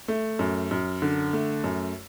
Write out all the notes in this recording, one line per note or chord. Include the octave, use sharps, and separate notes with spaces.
A3
F#2
F#2
D3
A3
F#2